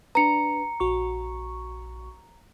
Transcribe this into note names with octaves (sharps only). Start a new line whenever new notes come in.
D4 B4 A#5 C#7
A#1 F#4 C#6